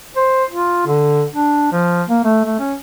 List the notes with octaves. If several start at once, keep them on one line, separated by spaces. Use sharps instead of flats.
C5
F4
D3
D4
F3
A#3
A3
A3
C#4